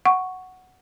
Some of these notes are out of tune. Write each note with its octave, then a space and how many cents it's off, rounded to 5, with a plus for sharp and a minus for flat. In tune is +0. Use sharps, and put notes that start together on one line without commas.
F#5 +0 C#6 +0